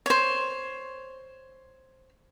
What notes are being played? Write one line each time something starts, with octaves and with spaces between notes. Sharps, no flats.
C5 C#5